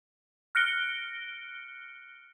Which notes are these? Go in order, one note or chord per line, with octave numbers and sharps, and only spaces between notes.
F6 F#6 A#6 C#7 D7 G7